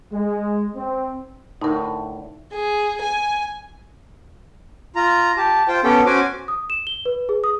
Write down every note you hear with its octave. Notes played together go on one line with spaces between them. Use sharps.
G#3
C4
D2 A2 D#4 A#4
G#4
G#5
F4 A#5
G4 A5
F4 C5 G5
B3 C#4 G4 A4 G5
C#4 F#4 C5 G#5 D6
D#6
E7
G7
B4
G#4
D#6